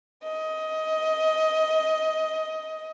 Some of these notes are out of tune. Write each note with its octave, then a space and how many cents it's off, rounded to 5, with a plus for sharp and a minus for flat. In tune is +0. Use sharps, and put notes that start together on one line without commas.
D#5 +15